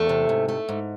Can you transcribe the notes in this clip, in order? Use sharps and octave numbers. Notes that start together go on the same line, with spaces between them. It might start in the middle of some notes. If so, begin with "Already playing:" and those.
Already playing: E2 A3
C3
G#2
A3
G#2